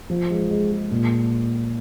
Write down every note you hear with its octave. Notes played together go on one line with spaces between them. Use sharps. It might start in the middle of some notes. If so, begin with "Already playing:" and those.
F3
G#3
G#3
G#3
A#2